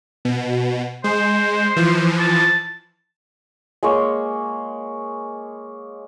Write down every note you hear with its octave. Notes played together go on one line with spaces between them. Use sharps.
B2
G#3 C5
E3 F3
A5
G#3 A#3 C#5